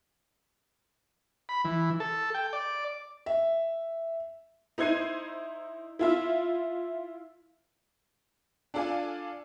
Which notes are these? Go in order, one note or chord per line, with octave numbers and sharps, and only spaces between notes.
B5
E3
A4
G5
D5
E5
D#4 E4 C5 G#6 C7 D#7
E4 F4 E5
D4 F4 A4 D5 F5 G#5